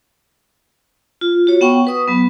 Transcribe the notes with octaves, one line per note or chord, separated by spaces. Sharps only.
F4
F#4 C#5
B3 F#5 G5 C#6
B4 D#6
F#3 B3